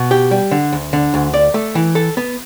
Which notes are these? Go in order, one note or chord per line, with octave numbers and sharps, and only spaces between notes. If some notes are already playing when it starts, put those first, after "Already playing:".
Already playing: B2
G4
G3
D3
D2
D3
D2
D5
A3
E3
A4
B3